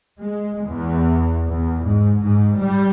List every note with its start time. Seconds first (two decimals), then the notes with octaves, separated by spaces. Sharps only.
0.19 G#3
0.65 E2
1.48 E2
1.84 G#2
2.23 G#2
2.59 G3